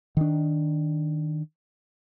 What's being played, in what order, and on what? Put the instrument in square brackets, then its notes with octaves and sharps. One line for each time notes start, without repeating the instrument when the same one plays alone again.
[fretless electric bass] D#3 D4